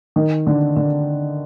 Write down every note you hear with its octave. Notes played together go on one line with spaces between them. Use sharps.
D#3
D3
D3